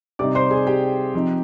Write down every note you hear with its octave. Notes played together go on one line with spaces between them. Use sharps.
C3 G3 C4 D#4 D5 D6
C5 C6
G#4 G#5
G4 G5
F3 C4 D#4